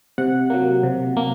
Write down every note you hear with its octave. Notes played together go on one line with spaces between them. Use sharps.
C3 F#5
F#3 A#3
C3
A#3